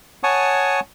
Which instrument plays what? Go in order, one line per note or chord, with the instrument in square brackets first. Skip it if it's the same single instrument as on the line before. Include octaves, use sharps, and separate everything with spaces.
[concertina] C#5 F#5 G#5 A5 C#6 D#6